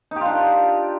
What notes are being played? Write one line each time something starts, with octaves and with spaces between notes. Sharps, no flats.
D4 D#4 F4 G4